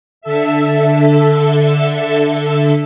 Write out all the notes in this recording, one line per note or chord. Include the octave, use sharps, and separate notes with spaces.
D3 A4 E5